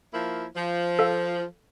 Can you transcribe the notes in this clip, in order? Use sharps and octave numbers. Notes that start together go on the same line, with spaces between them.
F3 A#3 E4
F3
A4 F5